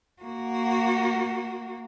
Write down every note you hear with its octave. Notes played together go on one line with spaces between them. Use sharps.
A#3 F#4